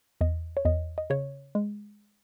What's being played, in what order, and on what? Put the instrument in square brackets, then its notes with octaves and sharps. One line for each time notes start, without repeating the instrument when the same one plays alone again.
[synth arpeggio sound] E2 D#5
C#5
E2 D#5
D#5
C#3 C#5
G#3